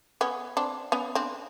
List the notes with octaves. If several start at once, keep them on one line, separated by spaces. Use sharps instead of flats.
B3 C#4
C4 D4
B3 C#4
C4 D4